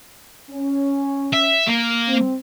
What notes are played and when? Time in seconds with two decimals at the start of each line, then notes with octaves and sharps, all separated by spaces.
0.50 C#4
1.33 E5
1.67 A#3
2.07 C4